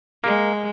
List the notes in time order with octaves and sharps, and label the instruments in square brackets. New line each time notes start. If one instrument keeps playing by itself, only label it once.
[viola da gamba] G#3 [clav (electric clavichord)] A#3